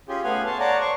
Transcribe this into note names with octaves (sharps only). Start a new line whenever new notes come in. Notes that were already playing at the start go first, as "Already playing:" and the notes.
C#4 F4 G4 G#4
A3 B3 F5 F#5 G#5
C#5 A5 C6
C#5 D5 F#5 A5 A#5
C5 D5 C#6